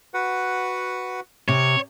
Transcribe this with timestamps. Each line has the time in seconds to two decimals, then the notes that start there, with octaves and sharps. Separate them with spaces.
0.14 F#4 B4 F#5
1.49 C3 C#5